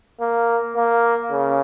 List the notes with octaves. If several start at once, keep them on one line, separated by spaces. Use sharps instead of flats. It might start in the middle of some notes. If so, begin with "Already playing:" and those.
A#3
A#3
C#3